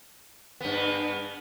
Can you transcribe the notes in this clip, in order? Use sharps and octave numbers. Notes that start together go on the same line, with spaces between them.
G2 B3